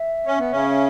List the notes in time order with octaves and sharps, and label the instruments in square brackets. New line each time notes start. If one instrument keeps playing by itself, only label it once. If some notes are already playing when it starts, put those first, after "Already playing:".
Already playing: [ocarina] E5
[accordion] C#4
B3
C#3 C#4
[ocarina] E5